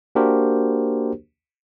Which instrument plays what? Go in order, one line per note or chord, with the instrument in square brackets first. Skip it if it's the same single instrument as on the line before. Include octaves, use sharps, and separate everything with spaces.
[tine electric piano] A#3 D4 F#4 G4 A#4 C5